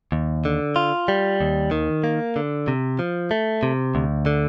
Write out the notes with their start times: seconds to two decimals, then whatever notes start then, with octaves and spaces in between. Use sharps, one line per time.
0.12 D#2
0.45 D3
0.76 F4
1.08 G3
1.41 D#2
1.71 D#3
2.04 A#3
2.36 D3
2.68 C3
2.99 F3
3.31 A3
3.63 C3
3.95 D2
4.26 D3